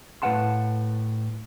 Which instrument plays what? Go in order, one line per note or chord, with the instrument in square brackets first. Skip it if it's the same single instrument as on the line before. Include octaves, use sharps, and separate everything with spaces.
[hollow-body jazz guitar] A2 B4 F5 F#5 A5 C6